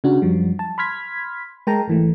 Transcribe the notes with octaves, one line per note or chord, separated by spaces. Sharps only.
C#3 D4 F#4
F#2 F3 G3
A5
B5 C6 F6 G#6 B6
G#3 A#4 G5 A5 A#5
G#1 E3 A3